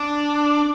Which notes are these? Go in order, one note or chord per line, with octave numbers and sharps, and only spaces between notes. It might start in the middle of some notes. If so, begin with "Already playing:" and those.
Already playing: D4